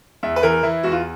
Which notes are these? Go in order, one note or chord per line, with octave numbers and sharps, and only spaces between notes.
E2 E5
B4
E3 A#4
E3 E4
E2 F#4
F4